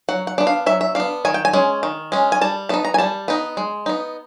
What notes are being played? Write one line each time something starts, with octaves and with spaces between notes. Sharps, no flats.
F#3 F#5
F#5
B3 D4
F5
F#3 E5
E5
B3 D4 F5
D#3 G#5
G5
G#5
G#3 C#4
D#3
G#3 C#4
G#5
G3 A5
B3 D#4 A5
A#5
G#5
G3 A5
B3 D#4
G#3
B3 D#4